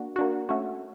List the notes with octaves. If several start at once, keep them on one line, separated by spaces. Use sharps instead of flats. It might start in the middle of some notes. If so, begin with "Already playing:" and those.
Already playing: A#3 D4 F#4
A#3 D4 F#4
A3 C#4 F#4